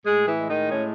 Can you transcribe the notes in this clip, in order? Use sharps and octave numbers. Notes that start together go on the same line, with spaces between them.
A2 G#3 G#4
E3 E4
G#3
D#3 D#4
A2 C#4